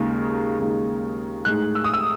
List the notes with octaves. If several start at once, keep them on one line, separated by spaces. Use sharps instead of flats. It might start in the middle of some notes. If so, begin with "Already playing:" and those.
Already playing: D#2 C#3 G#3 D#4
D#2 C#3 G#3 D#4
A2 G#3 D#4 F#6
E6
D#6
E6